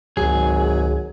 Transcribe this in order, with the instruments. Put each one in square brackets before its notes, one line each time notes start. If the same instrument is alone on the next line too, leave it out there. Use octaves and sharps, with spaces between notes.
[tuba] G#1 [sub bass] C#2 [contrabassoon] F#3 [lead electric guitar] G#4